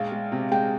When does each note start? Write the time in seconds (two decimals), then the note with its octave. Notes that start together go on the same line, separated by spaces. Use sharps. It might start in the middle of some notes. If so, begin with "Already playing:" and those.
Already playing: A#1 G#3 F5
0.12 G#3
0.32 C3
0.52 G#3 G5